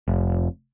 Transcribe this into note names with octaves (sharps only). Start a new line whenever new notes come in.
F1